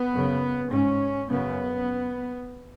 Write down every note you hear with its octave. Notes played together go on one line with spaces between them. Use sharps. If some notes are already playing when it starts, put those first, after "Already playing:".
Already playing: B3
F#2 C#3
G#2 C#4
F#2 C#3 B3